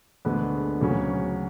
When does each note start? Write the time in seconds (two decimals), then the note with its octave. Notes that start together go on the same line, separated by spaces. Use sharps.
0.25 D2 D3 G#3 B3
0.81 D2 C#3 F#3 C#4